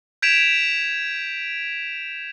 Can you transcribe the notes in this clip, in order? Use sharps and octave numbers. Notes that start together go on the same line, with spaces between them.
G6 G#6 B6 D7 E7 F7